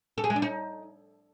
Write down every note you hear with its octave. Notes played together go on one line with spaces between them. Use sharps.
A4
G#4
G#3
D4
D#4